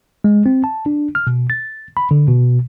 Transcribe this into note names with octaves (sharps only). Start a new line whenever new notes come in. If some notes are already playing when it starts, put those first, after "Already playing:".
G#3
C4
A5
D4
F6
B2
A6
B5
D3
B2